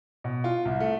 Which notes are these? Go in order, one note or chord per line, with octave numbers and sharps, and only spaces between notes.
B2
F4
C2
A3